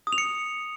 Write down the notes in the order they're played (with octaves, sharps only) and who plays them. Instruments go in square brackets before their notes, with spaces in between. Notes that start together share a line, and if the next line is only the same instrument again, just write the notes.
[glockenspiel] D#6
F7
C#7